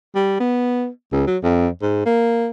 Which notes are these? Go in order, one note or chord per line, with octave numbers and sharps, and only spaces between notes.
G3
B3
C#2
F#3
F2
G#2
A#3